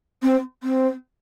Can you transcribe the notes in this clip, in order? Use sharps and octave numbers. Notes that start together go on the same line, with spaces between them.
C4
C4